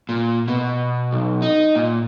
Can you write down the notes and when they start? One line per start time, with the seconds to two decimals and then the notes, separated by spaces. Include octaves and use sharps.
0.09 A#2
0.48 B2
1.13 B1
1.42 D#4
1.75 A#2